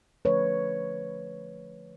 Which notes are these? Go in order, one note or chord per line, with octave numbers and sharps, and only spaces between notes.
D3 F3 A3 B4 C#5